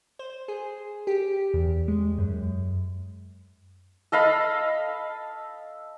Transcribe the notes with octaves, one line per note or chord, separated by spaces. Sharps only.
C5
G#4
G4
E2
G#3
F#2
A4 D#5 F5 B5